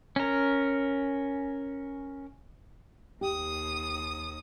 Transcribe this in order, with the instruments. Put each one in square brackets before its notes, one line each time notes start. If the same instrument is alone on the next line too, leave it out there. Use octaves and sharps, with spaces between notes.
[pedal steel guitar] C#4 A#4
[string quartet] D#2 D#6 [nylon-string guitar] G4